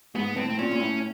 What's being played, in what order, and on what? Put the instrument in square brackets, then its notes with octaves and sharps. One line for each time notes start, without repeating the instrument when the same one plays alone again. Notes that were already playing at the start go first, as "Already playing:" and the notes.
[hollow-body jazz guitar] G#2 [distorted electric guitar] B3
[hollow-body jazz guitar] A2 [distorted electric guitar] C4
[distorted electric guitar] C4
[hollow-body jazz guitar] A#2 [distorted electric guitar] C#4
[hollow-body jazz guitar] A#2
A2